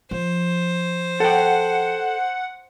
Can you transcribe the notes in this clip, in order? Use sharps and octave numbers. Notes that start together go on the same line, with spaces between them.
F3 C5
A4 F#5 G5